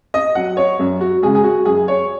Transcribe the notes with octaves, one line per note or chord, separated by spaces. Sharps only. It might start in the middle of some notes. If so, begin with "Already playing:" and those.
D#5
F#3 F#5
C#5
F#2
F#4
C#3 G#3 G#4
G#4
F#4
F#2 G#4
C#5